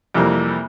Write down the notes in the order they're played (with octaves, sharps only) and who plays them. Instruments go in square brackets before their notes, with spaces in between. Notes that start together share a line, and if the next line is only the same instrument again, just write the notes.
[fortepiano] F2 C3 E3 G3 A#3